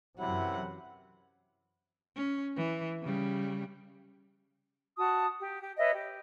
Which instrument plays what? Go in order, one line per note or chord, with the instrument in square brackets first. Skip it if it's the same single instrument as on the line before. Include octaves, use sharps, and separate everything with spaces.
[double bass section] F#2 E3 F#3 [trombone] C3 [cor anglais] E4 [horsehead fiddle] F#5
[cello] C#4
E3
C#3 G3
[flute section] F#4 A5 D#6
G4
G4
B4 C#5 D#5 E5
G4